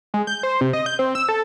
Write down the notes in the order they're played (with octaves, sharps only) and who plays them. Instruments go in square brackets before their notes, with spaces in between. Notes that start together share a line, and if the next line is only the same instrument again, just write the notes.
[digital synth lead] G#3
G6
C5
C3
D#5
G6
C4
E6
A4